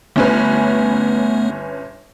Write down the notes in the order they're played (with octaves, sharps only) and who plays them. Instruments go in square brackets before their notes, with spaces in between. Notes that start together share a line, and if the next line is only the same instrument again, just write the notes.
[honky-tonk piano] G1 C#4 B4 [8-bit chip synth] A3 B3